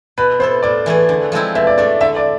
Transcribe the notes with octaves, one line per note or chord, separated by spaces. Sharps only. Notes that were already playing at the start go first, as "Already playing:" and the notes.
B2 B4
B3 E4 A4 C5
A2 D5
E3 A3 E4 G#4
D3
F3 G#3 C4 E4
B2 E5
D5
A3 D4 A4 D5
D3 E5
D5